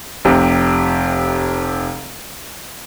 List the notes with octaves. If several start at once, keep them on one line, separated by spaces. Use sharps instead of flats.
F1 C3